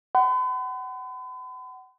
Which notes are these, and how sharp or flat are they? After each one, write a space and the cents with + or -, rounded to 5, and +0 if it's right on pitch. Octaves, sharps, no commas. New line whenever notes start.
F#5 +30 B5 +45